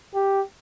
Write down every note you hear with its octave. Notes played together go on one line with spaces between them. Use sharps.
G4